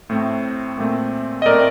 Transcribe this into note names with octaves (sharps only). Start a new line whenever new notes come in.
A2 A3 C4
A#2 A3 C4
D#5
A2 A3 C4 A#4 D5